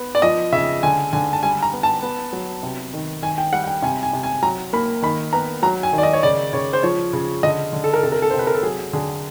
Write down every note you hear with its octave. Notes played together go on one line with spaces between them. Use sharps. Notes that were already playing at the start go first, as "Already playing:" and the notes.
Already playing: B3
D5
F3 D#5
C#3 E5
D3 G#5
D3 G#5
A5
G3 G#5
A#5
B3
A5
B3
F#3
C3
D#3
D#3 G#5
G5
G3 F#5
F#5
G5
C3 G#5
G#5
C3
G#5
F#3 A#5
A#3 B5
D#3 B5
B3 A#5
F#3 A#5
G#5
D#3
D5
D#5
C#5
C#3 D5
C#3 C#5
C5
F3 C#5
C#3
D3 D#5
D3
A4
A#4
C3 A4
A#4
A4
C5
C3
B4
A#4
A4
F#3 G#4
D3 G#4